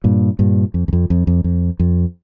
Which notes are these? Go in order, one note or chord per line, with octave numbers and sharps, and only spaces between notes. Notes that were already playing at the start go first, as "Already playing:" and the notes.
G2 A#2
G2 A#2
F2
E2
F2
F2
F2
F2
F2